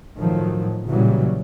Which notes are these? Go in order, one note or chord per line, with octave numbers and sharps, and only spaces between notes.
A2 D#3 F3 F#3
A#2 C#3 E3 F#3 G3